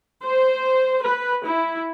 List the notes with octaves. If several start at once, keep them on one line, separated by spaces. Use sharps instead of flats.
C5
B4
E4